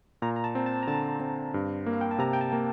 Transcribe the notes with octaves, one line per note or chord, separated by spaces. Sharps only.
A#2 A#5
A#5
A5
C4
A5
A#5
D3 A5
C4
G2
A#3
F5
G5
A5
C3 A#5
G5
A5
A#3